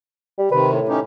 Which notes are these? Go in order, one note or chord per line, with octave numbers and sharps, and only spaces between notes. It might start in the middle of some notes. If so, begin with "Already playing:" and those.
G3
C3 D#3 B4
A2
C#4 D#4 G4